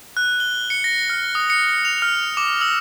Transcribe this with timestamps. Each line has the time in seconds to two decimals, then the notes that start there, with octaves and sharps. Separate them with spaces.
0.17 F#6
0.40 G7
0.70 C#7
0.84 A#6
1.10 F6
1.35 D#6
1.50 C#7
1.85 F7
2.02 F6
2.37 D6
2.61 E6